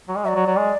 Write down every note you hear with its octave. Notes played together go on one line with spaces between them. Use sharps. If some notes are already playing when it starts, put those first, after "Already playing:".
F#3
G#3
F#3 E5
D5
F#3
F#3
G#3